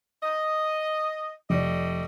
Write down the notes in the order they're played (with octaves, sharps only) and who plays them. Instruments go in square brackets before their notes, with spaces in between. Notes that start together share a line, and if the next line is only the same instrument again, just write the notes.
[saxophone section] D#5
[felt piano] F1 D5 [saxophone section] G3 A3 D#5